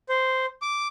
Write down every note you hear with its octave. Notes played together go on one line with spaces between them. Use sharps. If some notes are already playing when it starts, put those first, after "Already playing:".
C5
D6